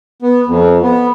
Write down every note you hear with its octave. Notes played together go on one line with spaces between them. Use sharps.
B3
F2
B3